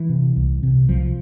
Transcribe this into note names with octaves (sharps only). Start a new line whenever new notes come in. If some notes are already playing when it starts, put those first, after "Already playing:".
Already playing: E3
C3
C2
C3
C2 F3